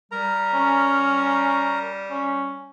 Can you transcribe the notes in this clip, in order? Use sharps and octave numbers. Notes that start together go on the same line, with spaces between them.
G3 A#4 A#5
C#4
C#4